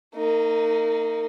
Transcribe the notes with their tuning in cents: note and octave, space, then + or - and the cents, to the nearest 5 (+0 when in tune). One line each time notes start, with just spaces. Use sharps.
A#3 -30 D#4 +0